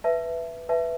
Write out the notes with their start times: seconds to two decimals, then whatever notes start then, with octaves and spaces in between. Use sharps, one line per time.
0.04 B4 E5 A5
0.69 B4 E5 A5